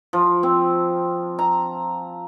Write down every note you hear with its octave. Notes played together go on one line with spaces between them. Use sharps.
F3
C4
A#5